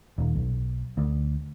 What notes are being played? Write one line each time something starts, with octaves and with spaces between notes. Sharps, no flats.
D#1
B1
D2